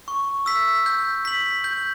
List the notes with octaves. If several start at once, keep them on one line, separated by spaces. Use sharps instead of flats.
C#6
E6 B6
G6
B6 F#7
G6